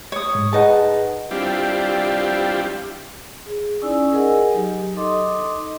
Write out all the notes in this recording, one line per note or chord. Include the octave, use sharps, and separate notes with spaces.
C#5 D#6
G#2
D#4 G#4 B4 F#5 A5
G3 C4 D4 E4 F4 G4
G#4
C#4 D#4 E4 D5 G#5 E6
G#4 A#4 D#5 F#5 G#5
F#3 D#4 G4
D#4 A4 D#5 C6 D6 D#6